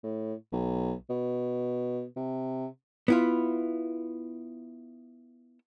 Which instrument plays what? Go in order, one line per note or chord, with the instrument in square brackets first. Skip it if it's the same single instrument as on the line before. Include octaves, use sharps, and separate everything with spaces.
[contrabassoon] A2
B1
B2
C3
[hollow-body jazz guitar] B3 E4 F4